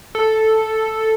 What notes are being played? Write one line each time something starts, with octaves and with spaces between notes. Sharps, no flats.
A4